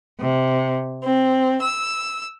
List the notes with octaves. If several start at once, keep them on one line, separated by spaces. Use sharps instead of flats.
C3
C4
E6